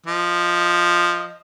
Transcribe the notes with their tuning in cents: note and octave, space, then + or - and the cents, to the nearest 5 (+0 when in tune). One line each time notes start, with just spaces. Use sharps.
F3 +0 D#5 +0